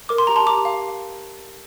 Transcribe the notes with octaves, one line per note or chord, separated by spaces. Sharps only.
A#4 D6
C6
G4 A#5
A5 C6
G4 A#5 D6
F5